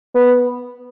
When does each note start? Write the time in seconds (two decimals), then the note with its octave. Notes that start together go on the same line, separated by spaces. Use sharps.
0.15 B3